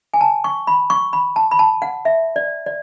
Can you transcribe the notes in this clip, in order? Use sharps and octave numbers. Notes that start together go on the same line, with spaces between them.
G#5
A5
C#6
B5
C#6
B5
A5
B5
A5
F#5
E5
D5
D5